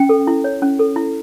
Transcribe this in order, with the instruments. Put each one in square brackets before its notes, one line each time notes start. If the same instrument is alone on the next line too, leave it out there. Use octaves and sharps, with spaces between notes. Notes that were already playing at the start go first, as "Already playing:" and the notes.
Already playing: [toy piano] C#4 G5
A4
E4
C#5
C#4
A4
E4